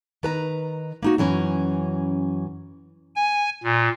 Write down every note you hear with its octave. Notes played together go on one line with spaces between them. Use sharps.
D#3 B4 A#5
A#3 D#4 F#4
F#2 E3 C#4 A#5
G#5
A#2